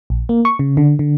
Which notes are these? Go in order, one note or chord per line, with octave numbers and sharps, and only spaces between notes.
A#1
A#3
C#6
C#3
D3
D3